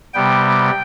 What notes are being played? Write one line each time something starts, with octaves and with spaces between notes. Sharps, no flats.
C3 G3 B3 G5